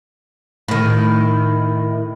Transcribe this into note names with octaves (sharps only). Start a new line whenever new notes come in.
A2 D#3